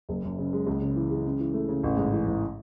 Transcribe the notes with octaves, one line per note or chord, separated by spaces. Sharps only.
F#1
F#2
C#3
G#3
C#2
C#3
E3
G#3
C#3
E3
A3
C#3
A1
G#2
E3
A1